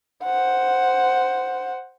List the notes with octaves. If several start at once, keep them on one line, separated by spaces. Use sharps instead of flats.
C5 F#5